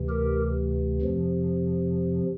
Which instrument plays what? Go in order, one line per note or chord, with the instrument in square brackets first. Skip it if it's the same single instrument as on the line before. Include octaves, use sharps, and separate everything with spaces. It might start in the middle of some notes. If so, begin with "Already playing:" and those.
Already playing: [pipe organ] D2 C3 E3
G4 A#4
F2 C3 F3